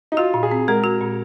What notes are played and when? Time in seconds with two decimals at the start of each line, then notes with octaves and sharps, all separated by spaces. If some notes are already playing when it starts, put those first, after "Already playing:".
0.12 D#4
0.17 F4 F#4
0.34 A#2
0.43 G#4
0.51 C4
0.68 G#3 A#4
0.84 F#4
1.01 A#2